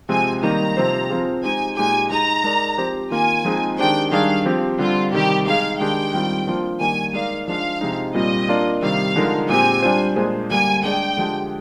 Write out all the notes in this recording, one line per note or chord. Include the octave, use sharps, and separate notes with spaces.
C3 F3 G#3 C4 G#5
D#3 G3 A#3 D#4 A#5
C3 F3 C4 G4 C5
F3 C4 F4 G#4
G#3 D#4 G4 C5 G#5
A#2 G#3 D#4 G4 G#5
G#3 D#4 G#4 A#5
G#3 D#4 A#4 D5
F3 C4 G4 C5
D#3 A#3 F4 G#5
F3 G#3 C4 D#4 G#4
D#3 G#3 D4 G4 C5 G5
D#3 G3 D4 G#4 F5
F3 C4 G4
D3 G3 C4 F4
C3 D#3 G3 G4
G#3 D#4 G#4 F5
D#3 G#3 D4 G4 G5
D#3 G3 C4 F4
F3 A#3 D4 F4 C5
D#3 G3 A#3 G#5
G#3 D#4 A#4 D5 F5
F3 G#3 D4 F5
C3 F3 G#3 D#4
A#2 G3 C4 F4 D#5
A#3 D4 F4 A#4 D5
C3 D#3 G3 F5
D3 F3 G#3 D#4 A#4
A#2 G#3 C4 G4 G#5
G3 D4 F4 C5
A#2 G#3 D4 G#4 C5
D3 G3 A#3 G#5
G#3 D4 G#4 D5 G5
D3 F3 G#3 D4 G4